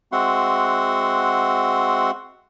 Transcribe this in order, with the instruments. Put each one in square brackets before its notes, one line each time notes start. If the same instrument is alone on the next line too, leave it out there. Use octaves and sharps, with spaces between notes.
[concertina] G#3 C4 F#4 E5 F#5 C6